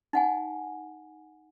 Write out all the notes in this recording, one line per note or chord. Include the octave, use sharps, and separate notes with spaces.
D#4 F#5 G#5